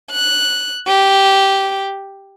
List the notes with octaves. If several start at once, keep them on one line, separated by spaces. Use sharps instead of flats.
F#6
G4